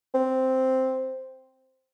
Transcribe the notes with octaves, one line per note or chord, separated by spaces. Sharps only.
C4